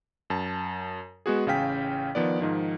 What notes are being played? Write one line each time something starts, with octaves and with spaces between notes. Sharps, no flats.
F#2 A5
G#3 B3 F#4 G#4
A1 C#3 C#4 F5 G5 B6
D#3 F3 B3 D5
G#2 D#3 F3